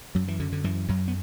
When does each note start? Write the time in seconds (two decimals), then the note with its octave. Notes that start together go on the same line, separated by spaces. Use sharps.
0.15 F#2 F#3
0.28 E3
0.39 F#2 D3
0.52 D3
0.64 F#2 E3
0.88 F#2 F#3
1.08 B3